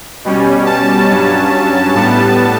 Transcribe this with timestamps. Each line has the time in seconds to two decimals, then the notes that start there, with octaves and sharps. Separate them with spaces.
0.25 B2 G3 C#4
0.66 A5
1.09 G2 F#3 C#4
1.95 A2 G3 B3 A5